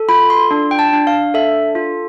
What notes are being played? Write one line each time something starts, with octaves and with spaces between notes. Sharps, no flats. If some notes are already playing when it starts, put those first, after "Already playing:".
Already playing: A4
F4 B5
C6
D4
G5
A5
D4
F5
A4 E5
F4